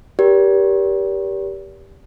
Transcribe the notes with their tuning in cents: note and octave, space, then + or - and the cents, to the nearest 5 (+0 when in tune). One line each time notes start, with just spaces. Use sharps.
G4 +0 A#4 +40 D5 -45